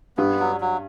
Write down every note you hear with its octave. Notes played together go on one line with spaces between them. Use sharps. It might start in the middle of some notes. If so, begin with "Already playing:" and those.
G2 B3
F#3
F#3